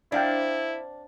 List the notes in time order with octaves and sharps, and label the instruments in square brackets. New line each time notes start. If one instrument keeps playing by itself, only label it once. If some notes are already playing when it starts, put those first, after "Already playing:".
[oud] C4 [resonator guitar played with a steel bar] D4 [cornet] E4 [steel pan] D5 F5 G5